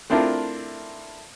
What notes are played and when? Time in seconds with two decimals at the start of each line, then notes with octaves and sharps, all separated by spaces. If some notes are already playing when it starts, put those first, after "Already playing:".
0.10 A3 C4 D4 E4 F4 A#4